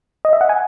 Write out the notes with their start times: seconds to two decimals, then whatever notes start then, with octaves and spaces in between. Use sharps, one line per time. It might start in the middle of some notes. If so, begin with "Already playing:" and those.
0.25 D#5
0.33 E5
0.41 F#5
0.49 G#5